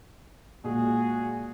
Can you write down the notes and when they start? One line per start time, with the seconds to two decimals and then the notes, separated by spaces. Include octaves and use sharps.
0.64 A#2 G#3 F#4 G#4